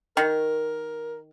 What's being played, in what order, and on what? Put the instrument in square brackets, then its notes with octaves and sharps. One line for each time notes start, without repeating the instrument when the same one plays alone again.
[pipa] D#3 [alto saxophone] A#4